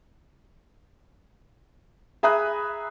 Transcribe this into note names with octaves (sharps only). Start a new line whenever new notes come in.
G#4 E5 A#5 B5 D#6 F#6